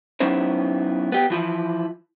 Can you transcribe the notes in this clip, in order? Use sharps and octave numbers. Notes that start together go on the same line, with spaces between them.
F#3 B3 C#4 D#4 E4 C5
B3 G4
E3 F3 E4